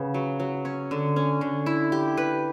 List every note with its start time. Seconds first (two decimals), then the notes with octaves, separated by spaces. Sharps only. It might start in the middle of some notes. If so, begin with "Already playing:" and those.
Already playing: C#3 B3
0.14 F#3
0.40 F#3
0.65 C#4
0.91 D3
1.16 C#4
1.41 D3
1.66 E4
1.92 G4
2.17 B4